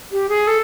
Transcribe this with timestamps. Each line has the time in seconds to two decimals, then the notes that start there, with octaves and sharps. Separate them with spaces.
0.12 G4
0.29 G#4
0.47 A4